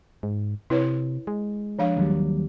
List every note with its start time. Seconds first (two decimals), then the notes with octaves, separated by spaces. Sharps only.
0.23 G#2
0.70 C3 E4 B4 C#5
1.27 G#3
1.79 F3 D4 F5
1.96 D#2 F#3 G3